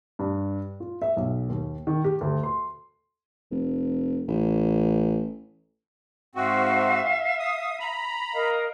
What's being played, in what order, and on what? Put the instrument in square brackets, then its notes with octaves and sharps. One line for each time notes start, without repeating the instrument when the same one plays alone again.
[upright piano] G2
F4
E5
B1
D#2
D#3
G4
D2
C6
[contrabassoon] F1
A1
[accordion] G#2 C4 F#4 [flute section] E5 F5
[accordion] D#6
A#5 B5
[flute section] A#4 D#5 F5